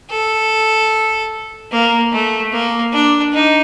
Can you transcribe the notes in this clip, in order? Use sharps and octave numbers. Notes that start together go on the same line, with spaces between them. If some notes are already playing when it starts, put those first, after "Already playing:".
A4
A#3
A3
A#3
D4
D#4